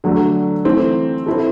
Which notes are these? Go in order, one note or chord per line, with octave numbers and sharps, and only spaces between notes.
D3 F#3 A3 D4
E3 A3 C4
C4 E4 A4